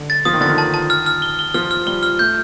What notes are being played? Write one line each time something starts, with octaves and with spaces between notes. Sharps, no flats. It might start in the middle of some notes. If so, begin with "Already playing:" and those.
Already playing: D3
A6
F3 D#6
D#3
D3 A6
D#3
A5
A5
F6
F6
G7
G7
F3 F6
F6
G3 G7
F6
A3 G6